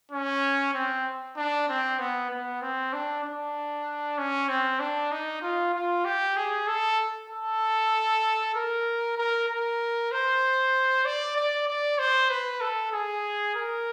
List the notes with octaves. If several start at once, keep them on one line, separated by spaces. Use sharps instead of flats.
C#4
C4
D4
C4
B3
B3
C4
D4
D4
C#4
C4
D4
D#4
F4
F4
G4
G#4
A4
A4
A#4
A#4
A#4
C5
D5
D5
D5
C5
B4
A4
G#4
A#4